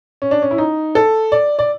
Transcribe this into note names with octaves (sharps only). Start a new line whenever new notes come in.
C#4
D4
C#4
E4
D#4
A4
D5
D5